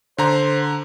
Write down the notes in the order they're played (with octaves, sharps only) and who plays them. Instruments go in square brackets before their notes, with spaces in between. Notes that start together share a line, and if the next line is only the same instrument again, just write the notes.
[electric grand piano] D3 A#5 [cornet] C5